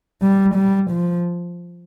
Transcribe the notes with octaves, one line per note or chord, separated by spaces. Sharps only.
G3
G3
F3